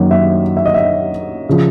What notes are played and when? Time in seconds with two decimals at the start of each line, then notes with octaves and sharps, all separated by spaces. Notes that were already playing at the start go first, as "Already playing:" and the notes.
Already playing: F#2 D#3 F#3 A#3
0.11 E5
0.57 E5
0.66 D#5
0.74 E5
1.49 C#3 F3